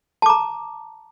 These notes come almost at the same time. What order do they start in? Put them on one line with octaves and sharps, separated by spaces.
A5 D6 A#5